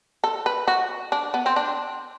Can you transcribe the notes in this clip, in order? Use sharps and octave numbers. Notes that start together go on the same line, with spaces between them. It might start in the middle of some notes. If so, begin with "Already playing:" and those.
A4
B4
F#4
D4
B3
C4
D4